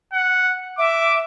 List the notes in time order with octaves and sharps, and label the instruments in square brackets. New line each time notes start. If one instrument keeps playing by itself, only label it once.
[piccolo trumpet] F#5
[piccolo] E5 [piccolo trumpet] D6